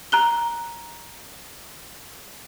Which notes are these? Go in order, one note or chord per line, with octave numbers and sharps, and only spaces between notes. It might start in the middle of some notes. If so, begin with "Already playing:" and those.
A#5 F#6 G7